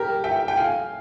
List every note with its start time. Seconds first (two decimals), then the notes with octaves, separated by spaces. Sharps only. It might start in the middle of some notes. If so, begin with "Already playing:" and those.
Already playing: G4 A#4
0.24 E5 G5
0.48 G5
0.57 F5 G#5